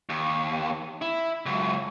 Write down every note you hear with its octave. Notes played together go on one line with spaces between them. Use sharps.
D#2
E4
C#2 F#2